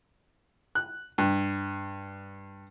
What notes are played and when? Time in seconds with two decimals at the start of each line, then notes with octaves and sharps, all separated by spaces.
0.75 F#6
1.18 G2